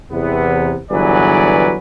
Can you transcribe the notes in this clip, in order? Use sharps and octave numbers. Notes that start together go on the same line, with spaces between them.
E2 C3 B3
G1 E3 F#3 G#4 B4 D5